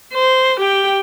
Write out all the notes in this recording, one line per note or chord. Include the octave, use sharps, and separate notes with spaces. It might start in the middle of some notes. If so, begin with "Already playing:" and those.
C5
G4 G5